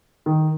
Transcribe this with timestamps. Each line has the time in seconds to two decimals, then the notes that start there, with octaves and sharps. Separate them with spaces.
0.26 D#3